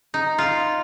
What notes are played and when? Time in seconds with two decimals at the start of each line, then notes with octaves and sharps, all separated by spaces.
0.14 D#4
0.38 F4